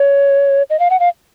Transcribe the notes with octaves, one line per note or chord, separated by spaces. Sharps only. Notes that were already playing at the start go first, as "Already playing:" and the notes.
Already playing: C#5
D#5
F5
F#5
F5